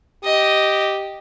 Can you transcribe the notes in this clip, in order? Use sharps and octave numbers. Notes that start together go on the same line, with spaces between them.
G4 D#5